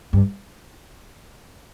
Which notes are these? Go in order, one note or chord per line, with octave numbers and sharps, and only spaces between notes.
G2